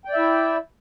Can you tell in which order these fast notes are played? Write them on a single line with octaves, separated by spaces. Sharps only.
G5 D5 E5 E4